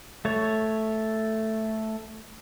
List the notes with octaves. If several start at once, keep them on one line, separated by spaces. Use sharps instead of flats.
A3 C#5